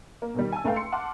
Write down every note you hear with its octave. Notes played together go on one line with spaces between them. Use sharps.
A#3
B2 D#3 G3
G#5 A5 E6
C#2 A3 B4 F5 G5
C6 C#7
F#5 A5 C6 D6 F6